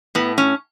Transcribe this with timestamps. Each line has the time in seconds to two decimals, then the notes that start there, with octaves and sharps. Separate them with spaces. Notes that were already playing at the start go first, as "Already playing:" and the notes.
0.15 A2 B3
0.38 C#4